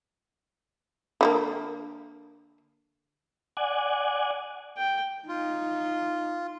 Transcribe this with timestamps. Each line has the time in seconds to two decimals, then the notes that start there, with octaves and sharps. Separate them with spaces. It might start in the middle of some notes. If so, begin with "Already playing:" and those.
1.21 D3 G3 A#3
3.57 D5 F#5 G#5
4.77 G5
5.28 D#4 F4